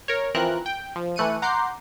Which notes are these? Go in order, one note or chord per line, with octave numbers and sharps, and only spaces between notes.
A#4 C#5
E3 F3 C4 A#4 F#6
G5
F3
E3 A3 F#6 C#7 D#7
F#5 A#5 C6 D6 G6 C7